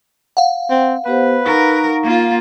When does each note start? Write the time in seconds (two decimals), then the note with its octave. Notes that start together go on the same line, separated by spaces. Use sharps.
0.37 F5 F#5
0.70 C4
1.06 B3 G4 B4 C5
1.45 D#4 A#4 C#6
2.03 A#3 F4